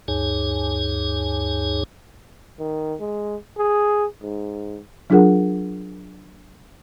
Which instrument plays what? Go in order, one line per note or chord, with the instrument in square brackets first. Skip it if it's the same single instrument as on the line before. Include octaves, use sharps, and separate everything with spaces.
[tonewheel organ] D2 G2 D#4 G#4 C#5 G#5
[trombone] D#3
G#3
G#4
G#2
[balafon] F#3 D4 F4 G#4 A#4 F#5